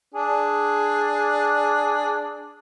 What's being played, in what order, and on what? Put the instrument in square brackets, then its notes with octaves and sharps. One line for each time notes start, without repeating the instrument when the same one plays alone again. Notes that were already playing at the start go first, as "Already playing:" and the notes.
[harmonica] D4 G#4